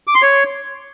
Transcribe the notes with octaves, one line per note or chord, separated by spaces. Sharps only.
D6
C6
C#5